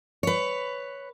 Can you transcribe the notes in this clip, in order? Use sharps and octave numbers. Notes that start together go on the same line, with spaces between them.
B4 C#5